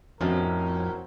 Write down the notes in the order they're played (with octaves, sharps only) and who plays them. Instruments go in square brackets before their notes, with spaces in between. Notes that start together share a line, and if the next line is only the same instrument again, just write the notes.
[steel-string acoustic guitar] F2 [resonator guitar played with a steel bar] A2 C#4 [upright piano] C4 F#4 [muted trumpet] A#4